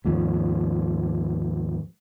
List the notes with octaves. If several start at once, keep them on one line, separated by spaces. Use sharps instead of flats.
D#2 G#2 F3